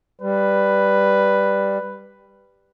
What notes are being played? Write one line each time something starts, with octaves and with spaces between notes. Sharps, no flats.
G3 B4